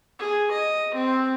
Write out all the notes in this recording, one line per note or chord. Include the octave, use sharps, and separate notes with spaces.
G#4
D#5
C4